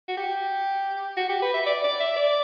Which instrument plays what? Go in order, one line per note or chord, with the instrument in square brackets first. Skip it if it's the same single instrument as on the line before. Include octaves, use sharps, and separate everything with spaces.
[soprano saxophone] F#4
G4
F#4
G4
B4
E5
D5
D5
E5
D5